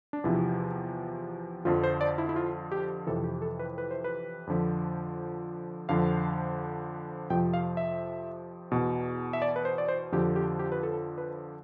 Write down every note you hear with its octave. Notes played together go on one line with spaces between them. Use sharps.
D4
E2 C3 F3 E4
F2 D3 F3 F4
C5
D5
E4
E4
F4
G4
F2 C3 E3 A4
G4
A4
B4
B4
C5
B4
F2 D3 F3
F2 D3 F3 F5
F2 C3 F3 G5
F5
E5
E2 B2
E5
D5
B4
C5
D5
C5
F2 D3 F3 G4
G4
G4
B4
A4
B4